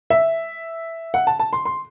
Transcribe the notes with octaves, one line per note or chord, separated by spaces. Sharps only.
E5
F#5
A5
A5
C6
C6